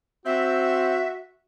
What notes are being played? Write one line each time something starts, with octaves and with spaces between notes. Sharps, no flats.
C4 F#4 E5